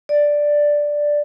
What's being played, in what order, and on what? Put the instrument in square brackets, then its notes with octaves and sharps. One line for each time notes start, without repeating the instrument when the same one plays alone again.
[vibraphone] D5